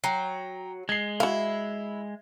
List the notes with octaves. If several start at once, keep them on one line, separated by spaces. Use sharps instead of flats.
F#3 G5 A#5 C7
G#3 G#6 C7
E4 F#4 F5